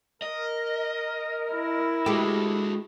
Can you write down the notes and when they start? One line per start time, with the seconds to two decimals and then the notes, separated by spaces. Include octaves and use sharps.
0.22 A#4 D#5
1.53 E4
2.06 G#3 F#4 G4 A4